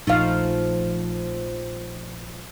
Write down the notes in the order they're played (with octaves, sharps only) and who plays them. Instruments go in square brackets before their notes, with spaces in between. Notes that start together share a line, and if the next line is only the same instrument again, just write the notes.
[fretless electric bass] A#1 [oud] F3 A3 [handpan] D#4 F5